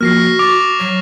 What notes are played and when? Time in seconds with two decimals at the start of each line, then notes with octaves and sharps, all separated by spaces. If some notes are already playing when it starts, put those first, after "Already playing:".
0.01 F3 A#3 F#4 F6 A#6 C7
0.39 C#6 D6 A6 F7
0.80 F#3